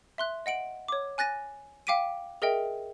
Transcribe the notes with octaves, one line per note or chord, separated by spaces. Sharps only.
E5 C6 F#6
D#5 F#5 D7 F#7
C#5 D6
G#5 F#6 A6 A#6 D#7
F5 G5 D6 B6 D7 D#7
G#4 A#4 D#5 E5 G5